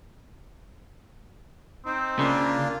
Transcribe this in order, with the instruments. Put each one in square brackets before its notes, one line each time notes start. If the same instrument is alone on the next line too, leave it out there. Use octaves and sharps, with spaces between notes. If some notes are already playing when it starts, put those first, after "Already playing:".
[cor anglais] C4 [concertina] D#4
[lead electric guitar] C#3 [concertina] A#3 D4 F4